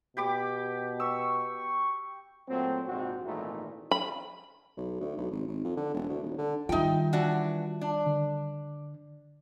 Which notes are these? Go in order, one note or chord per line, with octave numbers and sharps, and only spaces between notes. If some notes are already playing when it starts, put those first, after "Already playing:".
B2 G4 B5 D6
C#6 E6
A#2 F#3 A3 C4
A#1 G#2 C3 C4 F#4
G#1 A#2 E3 A3 D#4 E4
B5
B1
D2
B1
G#1
G#1
F2
D3
E1
D2
D#1
D3
D#3 G3 D#4 F4 E5 G5
E3 D4 F#4
D4
D3